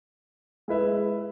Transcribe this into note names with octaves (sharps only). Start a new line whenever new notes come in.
G#3 E4 B4 E5